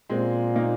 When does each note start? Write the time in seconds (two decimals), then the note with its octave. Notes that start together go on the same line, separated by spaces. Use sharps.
0.10 A#2 G#3 C4
0.56 A#3 D#4